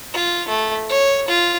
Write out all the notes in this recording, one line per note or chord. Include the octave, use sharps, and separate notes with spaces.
F4
A3
C#5
F4